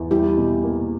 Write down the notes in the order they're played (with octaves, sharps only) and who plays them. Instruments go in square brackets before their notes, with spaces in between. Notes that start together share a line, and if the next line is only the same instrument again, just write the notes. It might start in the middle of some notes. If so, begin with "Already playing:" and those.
Already playing: [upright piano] E2
[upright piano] G3 [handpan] E4 G4
[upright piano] B2
A#3